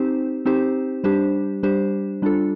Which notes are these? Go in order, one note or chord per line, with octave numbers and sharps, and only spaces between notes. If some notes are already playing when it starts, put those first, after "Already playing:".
Already playing: C4 D#4 G4 C5
C4 D#4 G4 C5
G3 D4 G4 C5
G3 D4 G4 C5
G3 D4 F4 A4